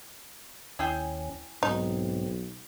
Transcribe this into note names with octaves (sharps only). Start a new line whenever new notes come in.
D#2 C#4 E4 G#4 G5
B1 G#2 C4 D#4